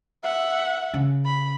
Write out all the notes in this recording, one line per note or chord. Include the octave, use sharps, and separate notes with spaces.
E5 F#5
C#3
B5